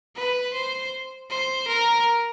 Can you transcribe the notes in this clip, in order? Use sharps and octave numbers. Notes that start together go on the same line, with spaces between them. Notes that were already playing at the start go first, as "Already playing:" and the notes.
B4
C5
C5
A#4